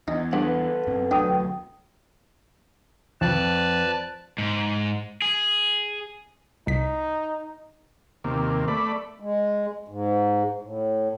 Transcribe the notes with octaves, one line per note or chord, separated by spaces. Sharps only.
E2 D#4
G2 A4 B4 F#5
F#2 C4
E1 D2 F#3 D4 G5 D#6
F2 B4 D5 A5
G#2
G#4
C2 D#4 B6
D#2 C3 A#3
A3 D5 B5
G#3
G#2
A2